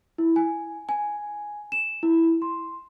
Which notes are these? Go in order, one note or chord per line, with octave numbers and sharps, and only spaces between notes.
E4
G#5
G#5
E7
E4
C6